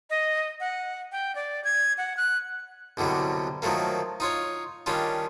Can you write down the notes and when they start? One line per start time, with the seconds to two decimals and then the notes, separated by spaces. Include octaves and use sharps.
0.10 D#5
0.60 F#5
1.12 G5
1.35 D5
1.64 G#6
1.98 F#5
2.17 F#6
2.97 C2 B2 D3 F#3 G3
3.62 D#3 F3 F#3 A3 A#3
4.20 D#4 F4 C#5
4.86 D#3 G3 C#4 D4 F4